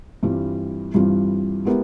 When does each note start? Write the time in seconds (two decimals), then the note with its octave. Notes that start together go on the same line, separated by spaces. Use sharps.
0.23 G2 E3 G3 C4 F4
0.94 G2 E3 G3 C4 F4
1.65 G#3 B3 E4 G4 A#4